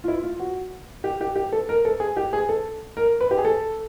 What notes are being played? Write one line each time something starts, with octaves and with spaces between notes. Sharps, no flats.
F4
E4
F4
F#4
G4
G4
G4
A4
A#4
A4
G#4
G4
G#4
A4
A#4
B4
G4
G#4
A4